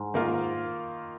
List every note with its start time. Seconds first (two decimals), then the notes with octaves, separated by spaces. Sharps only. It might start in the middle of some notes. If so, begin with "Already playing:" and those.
Already playing: G#2
0.14 D#3 A#3 F4 A#4